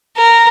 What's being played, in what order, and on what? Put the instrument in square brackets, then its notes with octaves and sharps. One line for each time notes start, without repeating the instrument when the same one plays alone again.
[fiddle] A#4